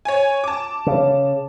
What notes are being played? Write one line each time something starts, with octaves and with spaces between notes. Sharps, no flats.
C#5 G#5
A5 D6
C#3